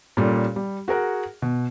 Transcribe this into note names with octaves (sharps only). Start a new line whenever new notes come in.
A#2 G3 C#4 A4
G3
F#4 G#4 A#4 F#5
B2